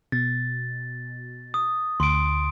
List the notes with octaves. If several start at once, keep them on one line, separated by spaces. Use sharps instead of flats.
B2 A6
D#6
D2 C6 D7